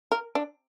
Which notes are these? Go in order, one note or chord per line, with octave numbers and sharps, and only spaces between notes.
A#4
D4